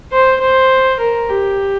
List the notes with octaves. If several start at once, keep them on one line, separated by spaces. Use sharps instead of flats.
C5
C5
A#4
G4